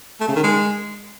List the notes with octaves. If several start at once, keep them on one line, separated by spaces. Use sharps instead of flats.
A3
C#3
D#3
G#3